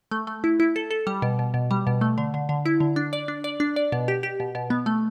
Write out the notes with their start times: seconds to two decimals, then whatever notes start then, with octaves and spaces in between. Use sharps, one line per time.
0.11 A3
0.27 A3
0.44 E4
0.60 E4
0.76 A4
0.91 A4
1.07 G3
1.22 B2
1.39 B2
1.54 B2
1.71 G3
1.87 B2
2.01 A3
2.18 D3
2.34 D3
2.49 D3
2.66 E4
2.80 D3
2.96 D4
3.13 D5
3.28 D4
3.44 D5
3.60 D4
3.76 D5
3.92 B2
4.08 G4
4.23 G4
4.40 B2
4.55 B2
4.70 B3
4.86 A3